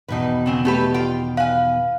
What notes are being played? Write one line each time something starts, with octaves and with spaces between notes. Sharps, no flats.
E2 B2 D#3 D#4 B4
C#3 C4 G#5
A3 G4 B4
F4 G5
B4 F5 G#5